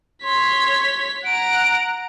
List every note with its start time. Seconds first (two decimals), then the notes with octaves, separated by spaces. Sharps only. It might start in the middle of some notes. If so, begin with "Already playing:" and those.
0.24 C#5 C6 B6
1.25 F#5 A#5 D7